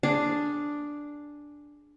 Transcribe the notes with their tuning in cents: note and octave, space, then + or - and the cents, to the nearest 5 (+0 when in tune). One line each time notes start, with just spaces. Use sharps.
D4 +0 G#4 +0